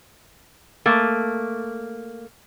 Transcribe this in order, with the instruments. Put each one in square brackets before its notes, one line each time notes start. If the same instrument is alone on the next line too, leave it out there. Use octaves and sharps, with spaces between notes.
[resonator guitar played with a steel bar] A3 A#3